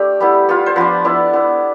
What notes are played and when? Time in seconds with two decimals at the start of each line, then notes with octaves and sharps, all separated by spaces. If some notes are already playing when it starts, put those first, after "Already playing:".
Already playing: A3 D4 G4 A4 B4
0.20 G3 B3 E4
0.49 B3 F4
0.66 C5
0.76 F3 B3 D4 B4
1.04 B3 E4 D5
1.33 B3 E4